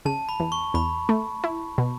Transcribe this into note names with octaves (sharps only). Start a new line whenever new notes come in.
C#3 A5
B5
E2
C#6
E2 B5
A3
E4
B2